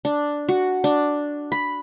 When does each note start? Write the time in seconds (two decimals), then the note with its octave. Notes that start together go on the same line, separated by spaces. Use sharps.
0.05 D4
0.49 F#4
0.84 D4
1.52 B5